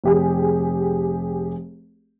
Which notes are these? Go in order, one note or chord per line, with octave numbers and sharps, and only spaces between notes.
F1 G4 G#4